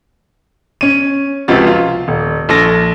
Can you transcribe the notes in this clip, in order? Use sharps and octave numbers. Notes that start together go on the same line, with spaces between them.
C#4 D#7
C#2 C3 F3 F#4 A6
F4
D#1
A#1 A4 A6 A#6